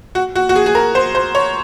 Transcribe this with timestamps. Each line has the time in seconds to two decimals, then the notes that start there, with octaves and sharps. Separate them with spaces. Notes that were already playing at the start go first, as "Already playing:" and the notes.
0.15 F#4
0.35 F#4
0.49 F#4
0.56 G#4
0.66 G#4
0.75 A#4
0.95 C5
1.15 C5
1.35 C#5